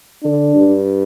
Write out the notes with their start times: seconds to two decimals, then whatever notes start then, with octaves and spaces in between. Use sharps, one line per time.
0.24 D3 D4
0.55 G2